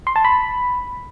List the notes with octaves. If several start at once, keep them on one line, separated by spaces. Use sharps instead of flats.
C6
A5
B5